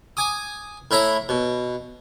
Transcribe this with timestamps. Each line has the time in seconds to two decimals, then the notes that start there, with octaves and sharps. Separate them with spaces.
0.17 G#5 D6 D#6
0.91 A2 E4 E5 A#5
1.29 B2